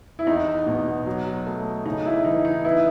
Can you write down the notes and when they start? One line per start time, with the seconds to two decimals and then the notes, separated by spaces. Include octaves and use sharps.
0.19 E4
0.27 E2 D#4
0.66 B2
1.06 F#3
1.46 A3
1.86 C#3 D#4
2.06 E4
2.25 E3 D#4
2.45 D#4
2.65 B3 E4